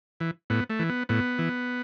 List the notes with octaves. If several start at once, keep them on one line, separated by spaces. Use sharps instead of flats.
E3
A2 B3
A3
E3
B3
A2 B3
E3